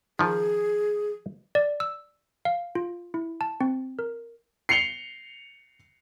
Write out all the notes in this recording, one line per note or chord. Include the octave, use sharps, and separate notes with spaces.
D#3 F3 G#4
D5
E6
F5
F4
E4
A5
C4
A#4
C7 C#7 F7 G7